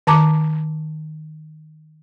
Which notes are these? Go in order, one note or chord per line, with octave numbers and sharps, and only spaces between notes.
D#3 A5 A#5 D6